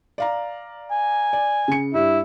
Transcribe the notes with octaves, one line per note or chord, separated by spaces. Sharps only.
D5 F5 A#5
G#5
D5
C#3 C#7
G2 E4